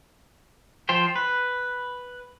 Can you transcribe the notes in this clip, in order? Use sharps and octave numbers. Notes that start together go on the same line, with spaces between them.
F3 F4 C5 G5
B4